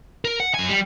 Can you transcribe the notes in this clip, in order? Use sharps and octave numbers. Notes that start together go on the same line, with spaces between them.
A#4
F#5
F#2 G#5
G3